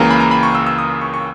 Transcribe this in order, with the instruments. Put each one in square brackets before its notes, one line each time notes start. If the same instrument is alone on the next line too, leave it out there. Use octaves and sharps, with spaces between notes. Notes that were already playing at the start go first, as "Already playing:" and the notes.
Already playing: [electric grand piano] C#2 C#3 E3 A#3 A#5
B5
A#5
B5
C#6
E6
E6
D#6
C#6
C#6